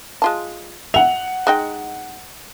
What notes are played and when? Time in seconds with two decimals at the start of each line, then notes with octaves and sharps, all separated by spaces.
0.22 G#3 F4 A5
0.94 E5 F#5 F7
1.47 G#3 D#4 G5